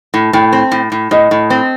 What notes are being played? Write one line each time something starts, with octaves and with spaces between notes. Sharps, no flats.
A2
A2 G5
C4
A2
A2
A2 D#5
A2
C4